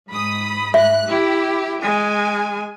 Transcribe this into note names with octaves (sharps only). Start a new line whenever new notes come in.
G#2 B5 D#6
G#2 E5 F#6
E4 G4
G#3 G#5